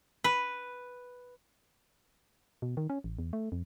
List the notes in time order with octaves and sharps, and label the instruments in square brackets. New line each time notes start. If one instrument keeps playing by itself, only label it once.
[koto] B4
[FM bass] B2
D#3
C#4
A1
E2
A3
F2